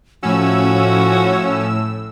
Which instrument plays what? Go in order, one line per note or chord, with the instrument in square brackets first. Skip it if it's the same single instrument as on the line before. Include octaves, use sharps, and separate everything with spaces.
[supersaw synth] A2 E6 [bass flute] F3 [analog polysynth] C#4 [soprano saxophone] F#4